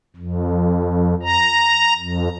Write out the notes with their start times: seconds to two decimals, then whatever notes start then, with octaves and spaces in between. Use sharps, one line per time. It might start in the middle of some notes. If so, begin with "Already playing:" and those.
0.16 F2
1.23 A#5
1.99 F2